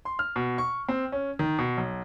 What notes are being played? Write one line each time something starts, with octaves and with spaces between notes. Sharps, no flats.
C6
F6
B2
C#6
C4
C#4
D#3
B2
B1